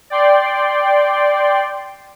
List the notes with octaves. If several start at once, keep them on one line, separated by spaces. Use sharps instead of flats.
D5 G5 C6